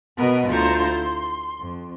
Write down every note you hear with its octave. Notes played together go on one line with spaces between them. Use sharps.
B2 B3 A#4 B4 D#5
D2 E4 F4 C5 A#5 C#6
C6
F2